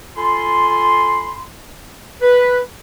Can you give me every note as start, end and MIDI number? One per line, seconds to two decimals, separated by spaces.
0.17 1.43 65
0.17 1.43 69
0.17 1.43 80
0.17 1.43 83
0.17 1.43 84
2.22 2.59 71